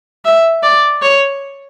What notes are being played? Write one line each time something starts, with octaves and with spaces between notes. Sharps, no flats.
E5
D5
C#5